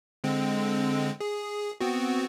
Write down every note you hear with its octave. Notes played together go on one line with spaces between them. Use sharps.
D3 G#3 C4
G#4
B3 C4 F#4